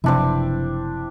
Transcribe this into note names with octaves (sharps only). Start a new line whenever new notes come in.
F#1 C3 F3 C4 D4 E4